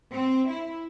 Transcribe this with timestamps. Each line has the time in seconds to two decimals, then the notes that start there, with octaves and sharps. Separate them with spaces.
0.12 C4
0.48 E4